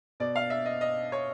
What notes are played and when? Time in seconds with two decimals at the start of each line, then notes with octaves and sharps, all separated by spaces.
0.20 B2 D5
0.36 F5
0.50 E5
0.66 D#5
0.81 D#5
1.12 C#5